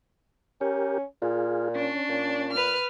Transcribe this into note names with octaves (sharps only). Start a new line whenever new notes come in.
C#4 G4 A#4
A#2 F4 G#4
C#4 D4
A#2
B4 F6